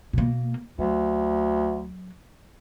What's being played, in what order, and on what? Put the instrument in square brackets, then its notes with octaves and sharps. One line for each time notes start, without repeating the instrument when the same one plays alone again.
[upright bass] B2 A#3
[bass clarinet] D2 [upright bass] F#3